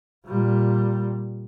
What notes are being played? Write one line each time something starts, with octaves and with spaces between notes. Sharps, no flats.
A#2 G3